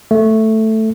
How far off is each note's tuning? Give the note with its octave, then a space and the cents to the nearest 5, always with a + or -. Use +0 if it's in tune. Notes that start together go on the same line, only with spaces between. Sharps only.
A3 +5